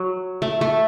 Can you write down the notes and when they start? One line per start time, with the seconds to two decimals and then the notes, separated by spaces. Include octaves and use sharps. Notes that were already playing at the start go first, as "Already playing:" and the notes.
Already playing: F#3
0.42 A3
0.61 A3